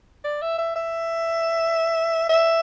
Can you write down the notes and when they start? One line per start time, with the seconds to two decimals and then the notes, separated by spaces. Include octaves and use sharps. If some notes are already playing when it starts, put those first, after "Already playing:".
0.24 D5
0.41 E5
0.58 E5
0.76 E5
2.29 E5